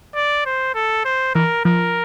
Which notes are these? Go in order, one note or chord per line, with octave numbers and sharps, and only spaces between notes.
D5
C5
A4
C5
E3 A#4
F3 A#4